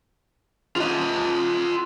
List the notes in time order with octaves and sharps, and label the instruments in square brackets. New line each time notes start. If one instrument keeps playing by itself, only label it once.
[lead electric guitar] F4 D#5